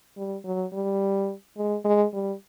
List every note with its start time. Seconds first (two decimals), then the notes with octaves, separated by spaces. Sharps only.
0.17 G3
0.44 F#3
0.73 G3
1.57 G#3
1.85 G#3
2.14 G3